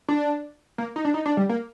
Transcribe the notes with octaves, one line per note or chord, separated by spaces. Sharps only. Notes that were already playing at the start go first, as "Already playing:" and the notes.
D4
A#3
D#4
D4
D#4
D4
G3
A#3